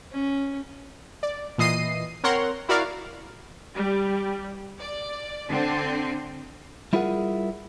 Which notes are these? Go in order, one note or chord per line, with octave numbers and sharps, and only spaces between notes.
C#4
D5
A#2 E3 D#5 C7 D#7
C4 A#4 C#5 F#5 C6
E4 F#4 A#4 D5 F5
G3
D5
D3 C4
G3 E4 F4 G#4 A#4 F#5